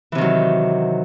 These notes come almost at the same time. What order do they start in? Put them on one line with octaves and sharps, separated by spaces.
E3 C3 D#3 F#3